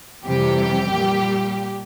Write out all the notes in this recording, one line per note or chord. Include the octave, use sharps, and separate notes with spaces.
F2 C3 E3 G3 G4
A#2 G3